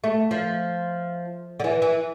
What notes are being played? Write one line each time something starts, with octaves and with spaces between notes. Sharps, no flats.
A3
F3
D3
E3
E3